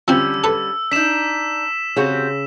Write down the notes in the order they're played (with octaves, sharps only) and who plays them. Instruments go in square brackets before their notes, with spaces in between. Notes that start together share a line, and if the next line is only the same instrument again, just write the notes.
[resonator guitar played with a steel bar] D3 G3 C#4 [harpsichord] F3 C4 [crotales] E6
[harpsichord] A4 B4
[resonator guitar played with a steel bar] D4 D#4 [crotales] B6 E7
[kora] C#3 C#5 [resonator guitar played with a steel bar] C4 F#4 G4